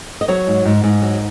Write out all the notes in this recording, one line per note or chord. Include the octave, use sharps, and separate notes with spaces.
D#5
F#3 C#5
G#2
G#2
G#2
F#3